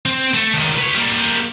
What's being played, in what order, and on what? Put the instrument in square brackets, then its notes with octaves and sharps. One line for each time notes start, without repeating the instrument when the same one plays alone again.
[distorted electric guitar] C4
A3
C#2 D#3
B4 C#5
G3 A#3